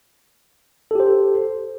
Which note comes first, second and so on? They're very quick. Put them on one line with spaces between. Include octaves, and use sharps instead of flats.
A4 G4 C5